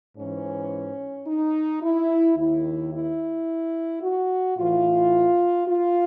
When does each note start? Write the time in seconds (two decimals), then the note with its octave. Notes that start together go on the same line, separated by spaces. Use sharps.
0.16 G#2 E3 C#4
1.26 D#4
1.82 E4
2.36 D#2 D#3 E4
2.92 E4
4.03 F#4
4.57 A2 E3 F4
5.67 F4